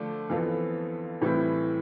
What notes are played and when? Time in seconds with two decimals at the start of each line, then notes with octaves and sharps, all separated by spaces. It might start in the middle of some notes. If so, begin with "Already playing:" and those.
Already playing: D3 F3 A3 D4
0.30 F2 E3 B3 F4 A4
1.22 A2 E3 G3 C4 E4